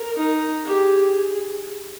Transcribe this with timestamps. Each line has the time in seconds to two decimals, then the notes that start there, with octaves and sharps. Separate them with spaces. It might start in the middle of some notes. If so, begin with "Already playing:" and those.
Already playing: A#4
0.16 D#4
0.65 G4 G#4